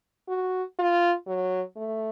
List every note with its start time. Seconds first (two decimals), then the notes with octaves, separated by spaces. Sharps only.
0.29 F#4
0.79 F4
1.27 F#3
1.77 A3